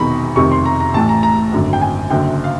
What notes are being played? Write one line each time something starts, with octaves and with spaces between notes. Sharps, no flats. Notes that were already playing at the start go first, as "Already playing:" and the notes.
Already playing: E1 E2 C3 D#3 A#5 B5 C#6
F1 F2 C3 D#3 C#6
C6
A#5
A#5
A1 A2 E3 A5
A#5
A#5
G#1 F#2 D3
G5
G#5
F#1 F#2 D3 G5
F5